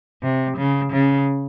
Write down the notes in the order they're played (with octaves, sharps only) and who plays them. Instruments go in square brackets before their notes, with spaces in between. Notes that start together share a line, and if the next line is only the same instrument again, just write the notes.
[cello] C3
C#3
C#3